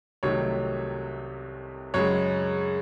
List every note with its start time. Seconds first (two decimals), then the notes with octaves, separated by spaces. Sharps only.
0.23 C2 C3 D#3 F#3 A3 C#5
1.94 F#2 C#3 G#3 C#5